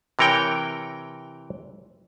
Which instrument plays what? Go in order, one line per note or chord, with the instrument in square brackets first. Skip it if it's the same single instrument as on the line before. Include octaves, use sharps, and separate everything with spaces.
[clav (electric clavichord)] C3 E3 A#4 C#5 G5